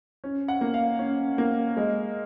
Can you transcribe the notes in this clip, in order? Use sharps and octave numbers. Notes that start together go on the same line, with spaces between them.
C#4
F#5
A#3
F5
C#4
A#3
G#3